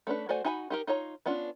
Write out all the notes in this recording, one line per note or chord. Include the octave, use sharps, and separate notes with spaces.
A3 C#4 D4 B4
A3 F#4 C5 D5 G#5
D#4 F#4 G#5 A#5 B5
D#4 G4 A#4
D#4 F4 C#5 A#5
B3 C#4 D4 F4